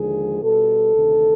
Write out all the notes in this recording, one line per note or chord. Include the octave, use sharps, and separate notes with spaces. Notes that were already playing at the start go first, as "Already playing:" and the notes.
Already playing: D#2 D3 F3 G#3 G#4
B2 G3 A4
D2 C3 D#3